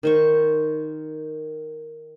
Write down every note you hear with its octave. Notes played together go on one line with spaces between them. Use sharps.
D#3 C5 C#6